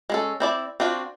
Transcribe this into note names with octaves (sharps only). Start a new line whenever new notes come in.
G#3 C#4 A4
C4 E4 D5
C4 D4 F4 F#4